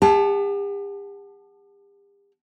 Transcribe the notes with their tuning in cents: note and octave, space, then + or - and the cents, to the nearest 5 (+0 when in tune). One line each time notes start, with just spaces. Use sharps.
G4 +45 F#5 +0 A5 -15